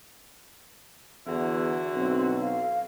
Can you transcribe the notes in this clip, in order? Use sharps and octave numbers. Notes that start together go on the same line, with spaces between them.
E2 D3 E4 F#4
B1 C4
F5